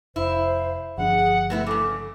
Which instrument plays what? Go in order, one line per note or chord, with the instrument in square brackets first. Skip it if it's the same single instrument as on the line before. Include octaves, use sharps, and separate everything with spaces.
[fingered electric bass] F1 [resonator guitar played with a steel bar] E4 [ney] C5 [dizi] F5
[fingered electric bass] G1 F3 D4 [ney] G#4 [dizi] F#5
[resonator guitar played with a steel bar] C3 B3 E4 [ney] A3
[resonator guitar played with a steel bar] G2 C#3 [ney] A4 [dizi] D6